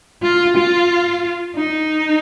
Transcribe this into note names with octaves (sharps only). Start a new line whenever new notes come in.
F4
F4
D#4